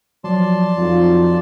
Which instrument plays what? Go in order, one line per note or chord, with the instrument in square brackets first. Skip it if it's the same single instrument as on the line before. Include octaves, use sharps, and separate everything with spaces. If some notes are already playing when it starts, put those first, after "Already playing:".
[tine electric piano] F3 F#3 [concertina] D5 A5 C6
[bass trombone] F2 [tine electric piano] F3 [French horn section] F#3 D#4 F4